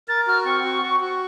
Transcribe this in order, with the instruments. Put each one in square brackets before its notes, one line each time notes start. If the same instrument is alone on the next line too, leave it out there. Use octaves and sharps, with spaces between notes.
[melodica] A#4 [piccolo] A6
[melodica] F#4 [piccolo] F6
[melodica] C4 [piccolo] C#6
[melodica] F#4
F#4
F#4